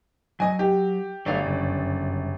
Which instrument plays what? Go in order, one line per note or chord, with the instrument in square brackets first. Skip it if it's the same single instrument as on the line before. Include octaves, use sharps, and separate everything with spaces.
[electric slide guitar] F#3 [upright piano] D#5 G#5
[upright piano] G4
[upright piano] G1 D5 [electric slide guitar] F#3 A3 F5
[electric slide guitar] F#2 C#3